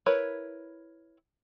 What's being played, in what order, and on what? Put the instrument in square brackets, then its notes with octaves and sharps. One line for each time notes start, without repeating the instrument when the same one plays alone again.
[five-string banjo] E4 A#4 B4 C#5